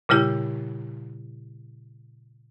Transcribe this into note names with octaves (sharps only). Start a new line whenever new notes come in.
A#2 C#3 G3 E4 G4